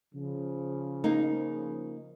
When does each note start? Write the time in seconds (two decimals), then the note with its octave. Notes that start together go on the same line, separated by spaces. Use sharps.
0.14 C#3 F3
1.04 A#3 D#4